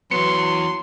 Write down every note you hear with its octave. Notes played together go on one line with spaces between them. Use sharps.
E3 F#3 B3 C6 C#7